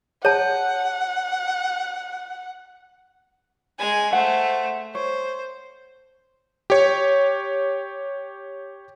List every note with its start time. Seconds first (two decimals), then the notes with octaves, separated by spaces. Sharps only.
0.25 C#5 F#5 A5
3.79 G#3 G#5
4.13 A3 C5 F#5
4.95 C5 C#5
6.70 G4 C#5